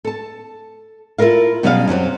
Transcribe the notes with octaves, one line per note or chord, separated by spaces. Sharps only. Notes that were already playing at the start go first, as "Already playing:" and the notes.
A4 A5
E4 F4 A4 A#4 F5
B2 F#3 G3 C#4 G#4 F5
F#2 C3 D#3 F#3